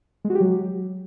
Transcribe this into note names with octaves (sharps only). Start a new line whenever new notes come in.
G#3
F#4
G4
F#3